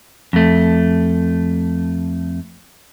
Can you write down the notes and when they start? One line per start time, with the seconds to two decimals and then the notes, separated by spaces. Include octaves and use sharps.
0.33 F2 A3